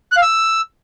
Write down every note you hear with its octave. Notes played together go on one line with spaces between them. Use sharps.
F#6
F5
E6